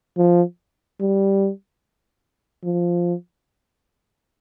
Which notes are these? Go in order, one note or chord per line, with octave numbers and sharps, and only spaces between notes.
F3
G3
F3